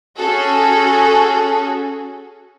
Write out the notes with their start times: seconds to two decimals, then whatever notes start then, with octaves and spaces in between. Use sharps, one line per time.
0.18 C#4 F#4 G#4 A4